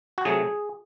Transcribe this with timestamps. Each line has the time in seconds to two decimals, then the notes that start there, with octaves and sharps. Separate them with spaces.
0.18 F#4
0.25 C3 F#3 A3 G#4